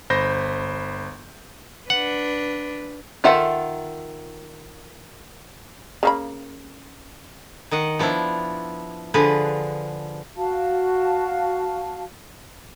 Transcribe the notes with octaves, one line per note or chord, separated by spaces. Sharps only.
G1 C5 B5 G6 A#6
D4 B4 F#5
D#3 F4 A4 E5 F#5
C#3 A#3 B5
D#3 D#5 F#5
F3 B3 D4 E4
D3 F3 G#4 B4
F#4 F5 A5